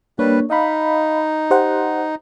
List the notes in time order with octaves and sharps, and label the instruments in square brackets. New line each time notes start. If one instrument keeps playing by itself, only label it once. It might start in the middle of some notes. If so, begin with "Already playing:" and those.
[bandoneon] G3 B4 [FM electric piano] A#3 D4 C#5
[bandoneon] D#4 [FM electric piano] D#5 F5 B5
[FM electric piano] G4 C5 F#5